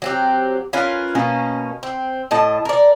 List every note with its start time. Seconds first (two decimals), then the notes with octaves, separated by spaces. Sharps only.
0.02 F#3 C4 G4
0.73 C#4 F4 A#4 B4
1.15 B2 A#3 C#4
1.83 C4
2.31 A2 D#5 A5
2.65 A#4 D5